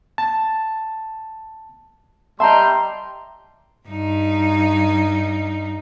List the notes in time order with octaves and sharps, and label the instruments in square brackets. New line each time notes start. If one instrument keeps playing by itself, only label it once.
[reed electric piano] A5
[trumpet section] G3 G5 C6 [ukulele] D#5 A5 [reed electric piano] E5 [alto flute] A#5
[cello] G2 D#4